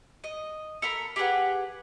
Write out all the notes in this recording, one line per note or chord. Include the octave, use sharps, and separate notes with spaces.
D#5
A4 A#4 A#5 B5
G4 G#4 B4 F#5